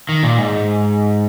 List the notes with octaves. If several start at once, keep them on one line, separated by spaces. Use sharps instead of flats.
D#3
A#2
G#2